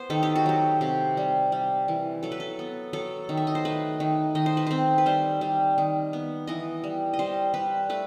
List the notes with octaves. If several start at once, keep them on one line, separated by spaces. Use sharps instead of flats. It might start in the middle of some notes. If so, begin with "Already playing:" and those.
Already playing: B3 C5
D#3 A4
G4
F#4
F#3 G4
C3 G4
G3
G3
E3
F#3 A4
B4
A4
B3
F#3 A4
D#3
E5
D#5
C5
A3 B4
D#3
D#3 D#5
C5
B4
C4 C5
B4
G3 C5
G3
D#3
B3
E3 D#5
G3
D#5
G3 C5
G3 B4
A3 B4